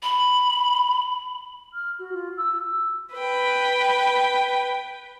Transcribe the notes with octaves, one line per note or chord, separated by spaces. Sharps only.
B5
F6
F#4
F4
E6
B4 G5